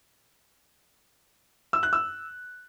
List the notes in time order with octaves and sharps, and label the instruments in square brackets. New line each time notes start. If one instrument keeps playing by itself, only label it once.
[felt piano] E6
F#6
E6